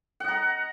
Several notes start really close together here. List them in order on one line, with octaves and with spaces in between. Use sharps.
F#5 D#5 A#5